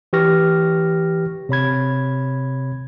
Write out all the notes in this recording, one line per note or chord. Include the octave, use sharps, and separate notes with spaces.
E3 G4 B4 C#6 F6 A#6
C3 C#5 B5 G#6